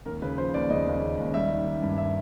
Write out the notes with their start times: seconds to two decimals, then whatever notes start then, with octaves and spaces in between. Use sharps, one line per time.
0.06 D#2 A#4
0.22 C#3 B4
0.38 F3 C5
0.54 D#2 D5
0.70 C#3 D#5
0.86 D#2
1.02 C#3
1.18 D#2
1.34 G3 E5
1.50 D#3
1.66 D#3
1.82 G2
1.98 E5